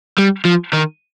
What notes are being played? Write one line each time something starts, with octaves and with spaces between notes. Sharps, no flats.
G3
F3
D#3